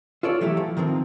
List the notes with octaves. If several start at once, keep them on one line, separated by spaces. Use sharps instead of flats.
F4 A4 C#5 D5
E3 F#3 A3 E4 G4
F3
D#3 F3 A#3 C4